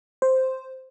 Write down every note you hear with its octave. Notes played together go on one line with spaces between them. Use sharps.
C5